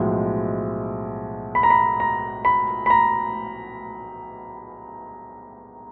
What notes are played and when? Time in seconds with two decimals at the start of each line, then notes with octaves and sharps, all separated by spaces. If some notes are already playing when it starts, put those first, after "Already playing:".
Already playing: B1 A2 F3 G#3
1.55 B5
1.63 A#5
1.70 B5
2.00 A#5
2.45 B5
2.86 B5
2.90 A#5